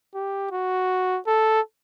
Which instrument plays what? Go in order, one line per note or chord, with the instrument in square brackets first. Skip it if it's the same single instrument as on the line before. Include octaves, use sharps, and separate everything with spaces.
[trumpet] G4
F#4
A4